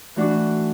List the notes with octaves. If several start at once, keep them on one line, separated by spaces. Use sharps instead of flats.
E3 A3 D4 F#4